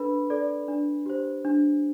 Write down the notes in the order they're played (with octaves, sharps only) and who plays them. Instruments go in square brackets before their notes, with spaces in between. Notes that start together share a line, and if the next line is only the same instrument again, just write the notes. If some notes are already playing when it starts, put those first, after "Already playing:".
Already playing: [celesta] D4 A4 B4 B5
A4 D5
D4
G4 C5
D4